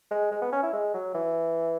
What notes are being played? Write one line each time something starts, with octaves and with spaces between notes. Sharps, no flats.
G#3
G#3
B3
C#4
E4
G#3
F#3
E3